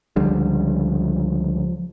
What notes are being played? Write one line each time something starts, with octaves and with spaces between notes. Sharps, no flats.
C#2 D3 F3 G3